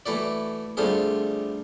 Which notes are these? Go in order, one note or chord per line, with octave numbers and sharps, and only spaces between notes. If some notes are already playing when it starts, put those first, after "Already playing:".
E3 A3 E4 F#4 D5
D3 G3 A3 C4 F4 G#4